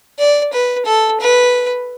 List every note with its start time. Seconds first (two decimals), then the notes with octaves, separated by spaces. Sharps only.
0.19 D5
0.53 B4
0.86 A4
1.21 B4